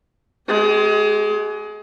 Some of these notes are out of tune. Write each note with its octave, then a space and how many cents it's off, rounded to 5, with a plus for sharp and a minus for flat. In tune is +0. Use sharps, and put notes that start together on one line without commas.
G#3 +25 G4 -20